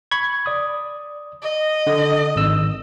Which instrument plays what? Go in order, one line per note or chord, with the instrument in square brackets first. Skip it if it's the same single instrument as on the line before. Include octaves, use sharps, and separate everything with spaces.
[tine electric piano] B5 C#6 G#6
D5 D#6
[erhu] D#5
[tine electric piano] D3
G#1 E6